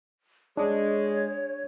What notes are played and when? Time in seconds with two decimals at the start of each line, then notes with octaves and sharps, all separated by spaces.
0.57 G#3 D4 C#5